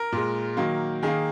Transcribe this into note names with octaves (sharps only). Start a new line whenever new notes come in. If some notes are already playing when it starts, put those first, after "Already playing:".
Already playing: A#4
A#2 G#3
D#3 F#3 A#3
D#3 A#3 G#4